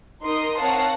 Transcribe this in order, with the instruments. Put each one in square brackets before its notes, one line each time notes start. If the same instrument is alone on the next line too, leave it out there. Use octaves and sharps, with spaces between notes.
[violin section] D#4 A#4 C6 D#6
C4 A#4 C#5 F5 F#5 A5